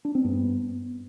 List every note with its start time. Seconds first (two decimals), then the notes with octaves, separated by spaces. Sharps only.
0.05 D4
0.15 C4
0.24 G2 B3